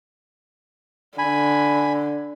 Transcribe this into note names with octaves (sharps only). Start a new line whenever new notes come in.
D3 G#5 B5